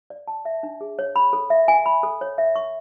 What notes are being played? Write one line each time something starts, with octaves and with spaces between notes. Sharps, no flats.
D5
A5
E5
D4
G#4
C#5
B5
A4
E5
G#5
B5
A4
C#5
E5
C#6